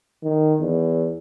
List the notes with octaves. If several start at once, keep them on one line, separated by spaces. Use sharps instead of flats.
D#3
E2